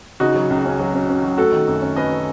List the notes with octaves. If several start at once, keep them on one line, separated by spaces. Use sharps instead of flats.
C#3 D#4 F#4
F#3
C#2
C#4
F#3
C#4
C#4
F#3
A3 F#4 A4
D#3
F#2
C#4
C#4 B4 D#5
C#4